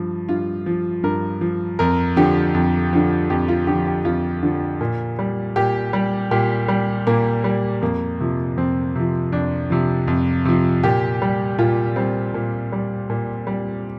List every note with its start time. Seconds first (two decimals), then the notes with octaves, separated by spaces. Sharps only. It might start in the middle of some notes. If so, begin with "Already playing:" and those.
Already playing: G2 F3
0.29 G2 F4
0.66 F3
1.03 G2 A#4
1.41 F3
1.79 F2 A#4
2.16 D3 F3 G4
2.54 F2
2.93 D3 F3
3.30 F2 G4
3.48 F4
3.67 D3 G4
3.72 F3
3.87 G4
4.05 F2 F4
4.43 D3 F3
4.81 A#2
5.19 G3
5.56 A#2 G4
5.93 G3
6.31 A#2 G4
6.68 G3
7.07 A#2 A#3
7.44 G3
7.82 F2 A#3
8.20 C3 F3
8.57 F2 C4
8.96 C3 F3
9.32 F2 D4
9.70 C3 F3
10.08 F2
10.45 C3 F3
10.83 A#2 G4
11.22 G3
11.59 A#2 F4
11.96 G3 C4
12.34 A#2
12.72 G3
13.10 A#2
13.47 G3